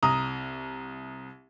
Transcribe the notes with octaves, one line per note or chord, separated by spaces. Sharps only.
C2 A#5 D#6